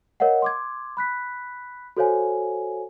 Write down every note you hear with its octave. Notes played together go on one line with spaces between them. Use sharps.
A#4 C#5 D#5 F5 F#5
C6 D6 G#6
B5 F#6 B6
F#4 A4 C5 C#5 F5 G#5